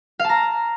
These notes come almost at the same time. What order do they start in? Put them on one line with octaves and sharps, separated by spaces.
F5 A5 A#5